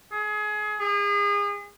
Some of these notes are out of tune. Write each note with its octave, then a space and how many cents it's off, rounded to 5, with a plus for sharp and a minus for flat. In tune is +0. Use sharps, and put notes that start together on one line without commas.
G#4 +25
G#4 -35